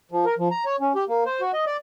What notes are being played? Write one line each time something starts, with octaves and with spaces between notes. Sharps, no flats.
F3
A#4
F3
A#5
C#5
C#4
G4
A#3
C5
F#4
D#5
D5